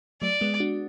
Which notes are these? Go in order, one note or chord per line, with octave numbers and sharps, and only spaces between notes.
F#3 A3 D5
G#3 B3
D4 F#4